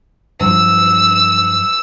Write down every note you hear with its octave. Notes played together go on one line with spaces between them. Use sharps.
G2 F3 F#3 E6